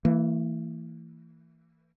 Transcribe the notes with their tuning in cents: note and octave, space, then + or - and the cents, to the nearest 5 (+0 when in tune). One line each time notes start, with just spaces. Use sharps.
E3 +0 A#3 -40